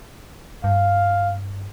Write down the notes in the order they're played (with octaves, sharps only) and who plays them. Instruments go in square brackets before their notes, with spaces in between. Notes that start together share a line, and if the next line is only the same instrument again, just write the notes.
[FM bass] G2 [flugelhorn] F5